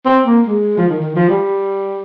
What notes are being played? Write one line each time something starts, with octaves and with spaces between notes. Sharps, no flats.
C4
A#3
G#3
F3
D#3
D#3
F3
G3